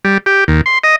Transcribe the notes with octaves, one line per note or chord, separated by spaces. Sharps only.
G3
G4
D#2
C6
D#5